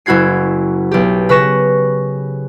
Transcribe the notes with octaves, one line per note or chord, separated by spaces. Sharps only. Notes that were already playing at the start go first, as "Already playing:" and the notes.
F#1 E4 F#4 G#6 C7
B1 G4
C#3 B4 C#6 A#6 E7